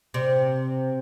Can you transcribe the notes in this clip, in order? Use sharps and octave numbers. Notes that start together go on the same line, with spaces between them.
C3